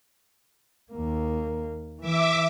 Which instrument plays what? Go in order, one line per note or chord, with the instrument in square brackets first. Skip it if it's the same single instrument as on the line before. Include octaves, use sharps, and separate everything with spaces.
[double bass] D#2 A#3
[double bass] E3 [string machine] E5 D6